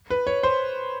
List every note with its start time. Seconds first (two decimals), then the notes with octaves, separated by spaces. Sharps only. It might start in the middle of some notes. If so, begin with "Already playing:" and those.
0.10 B4
0.27 C#5
0.43 C5